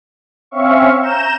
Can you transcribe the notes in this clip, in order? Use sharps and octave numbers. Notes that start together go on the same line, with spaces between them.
C4 C#4 E5 F5 C#6
A#5 G6 E7